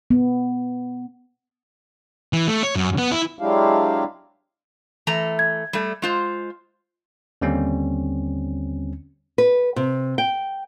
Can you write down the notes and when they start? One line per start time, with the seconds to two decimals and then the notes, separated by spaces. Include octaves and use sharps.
0.11 B3
2.33 E3
2.48 A3
2.63 C#5
2.75 F#2
2.98 B3
3.12 E4
3.39 F#3 G#3 D4 E4 G4 F5
5.07 E3 A3 A#5
5.39 G#6
5.73 G3 A3
6.02 G#3 F4 C5
7.41 D#2 D3 G3 C4 C#4
9.38 B4
9.76 C3
10.18 G5